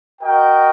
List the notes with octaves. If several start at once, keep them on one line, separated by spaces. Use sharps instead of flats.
F#4 A#4 D#5 G5